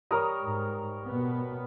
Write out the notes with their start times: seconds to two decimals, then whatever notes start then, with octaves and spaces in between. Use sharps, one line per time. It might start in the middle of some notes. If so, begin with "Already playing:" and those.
0.11 G3 A#4 C#5 A#5 D#6
0.44 G#2
1.08 B2 B3